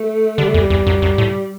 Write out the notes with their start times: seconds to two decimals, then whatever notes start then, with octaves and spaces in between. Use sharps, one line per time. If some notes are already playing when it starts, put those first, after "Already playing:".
Already playing: A3
0.38 D3 G3
0.48 A3
0.54 E2
0.58 G3
0.70 E2
0.87 F#2
1.02 F#2
1.18 A2